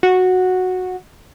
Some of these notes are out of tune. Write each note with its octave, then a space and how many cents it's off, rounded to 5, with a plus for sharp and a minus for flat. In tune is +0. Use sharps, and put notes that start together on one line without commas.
F#4 -10